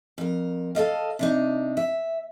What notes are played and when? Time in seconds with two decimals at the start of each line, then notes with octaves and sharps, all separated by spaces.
0.18 F2 A#4
0.75 A4 A#4 D#5 F5
1.19 C3 D4 D#4
1.77 E5